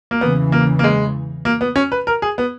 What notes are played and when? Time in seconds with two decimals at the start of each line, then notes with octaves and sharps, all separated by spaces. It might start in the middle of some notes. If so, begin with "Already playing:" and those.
0.11 A#3
0.21 E2 C#3 E3 B3
0.52 A#3
0.79 A#3
0.84 G#3
1.45 A#3
1.61 B3
1.76 C#4
1.92 B4
2.07 A#4
2.22 G#4
2.38 B3